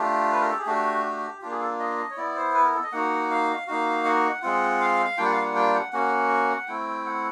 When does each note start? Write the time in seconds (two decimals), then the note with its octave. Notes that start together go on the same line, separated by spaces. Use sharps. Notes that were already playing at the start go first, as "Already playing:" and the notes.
Already playing: A3 D4 F4 G4
0.32 B4
0.41 A#4
0.50 A4
0.58 G#4
0.66 A3 D4 F#4 G4
1.05 G4
1.42 A#3 D4 F4 G4
1.51 G#4
1.61 A4
1.80 D#5
2.11 C#5
2.17 B3 E4 D5
2.36 C5
2.55 B4
2.64 A#4
2.74 A4
2.83 D#5
2.92 A#3 D#4 F#4 F#5
3.30 F5
3.67 A#3 D#4 F#4 F5
4.05 F#5
4.42 G#3 C4 F4 F#5
4.81 F5
5.18 G3 A#3 D4 F4 G5
5.25 F#5
5.33 F5
5.41 F#5
5.55 G5
5.75 F#5
5.93 A#3 C#4 F#4 F#5
6.68 A3 C4 E4 G5
7.06 F#5